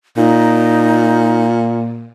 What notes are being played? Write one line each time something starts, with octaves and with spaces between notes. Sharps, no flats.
A#2 D#4